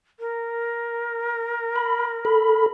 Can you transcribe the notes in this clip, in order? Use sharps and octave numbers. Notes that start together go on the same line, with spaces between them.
A#4
B5
A4 B5